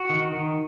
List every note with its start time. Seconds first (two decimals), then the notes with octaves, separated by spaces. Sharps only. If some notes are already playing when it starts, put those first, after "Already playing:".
Already playing: F#4
0.10 D#3
0.32 D#3